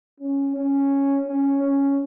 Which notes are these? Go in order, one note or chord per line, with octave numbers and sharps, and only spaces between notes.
C#4
C#4
C#4
C#4